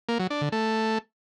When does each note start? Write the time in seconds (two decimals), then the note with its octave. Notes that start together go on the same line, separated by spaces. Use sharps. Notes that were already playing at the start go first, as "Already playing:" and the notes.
0.09 A#3
0.19 F#3
0.30 D4
0.41 D3
0.52 A3